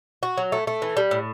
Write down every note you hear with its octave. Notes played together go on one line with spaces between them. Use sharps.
F#4
F#3
A3
A3
E3
G3
A2